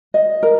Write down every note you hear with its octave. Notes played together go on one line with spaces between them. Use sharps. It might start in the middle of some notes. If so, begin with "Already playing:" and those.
D#5
A#4